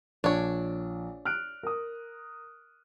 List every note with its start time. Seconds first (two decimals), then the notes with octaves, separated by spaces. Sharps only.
0.24 A#1 D4 C#5
1.25 F6 F#6 D7
1.63 A#4 D#6